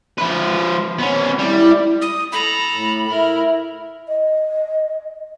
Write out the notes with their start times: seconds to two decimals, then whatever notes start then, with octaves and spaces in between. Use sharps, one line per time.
0.18 F3 B4
0.99 B3 C#4
1.38 G3 E4
2.02 D#6
2.32 A4 A#5 B5
2.71 A2
3.10 E4 A#4
4.08 D#5